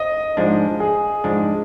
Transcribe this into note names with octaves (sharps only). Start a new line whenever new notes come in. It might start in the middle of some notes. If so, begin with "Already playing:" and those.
Already playing: D#5
G#2 F3 G#3 D4
G#4
G#2 F3 G#3 D4